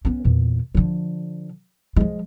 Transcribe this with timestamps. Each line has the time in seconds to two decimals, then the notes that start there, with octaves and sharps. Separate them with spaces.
0.05 B3 C#4
0.25 E2 A#2
0.75 D3 F3
1.96 F3 G#3